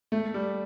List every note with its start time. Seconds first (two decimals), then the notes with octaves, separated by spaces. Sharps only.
0.12 A3
0.34 G3